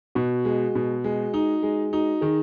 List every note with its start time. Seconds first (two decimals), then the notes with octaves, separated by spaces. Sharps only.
0.15 B2 F#4
0.45 G#3
0.75 B2
1.04 G#3
1.34 D#4
1.63 G#3
1.93 D#4 F#4
2.21 D#3 G#4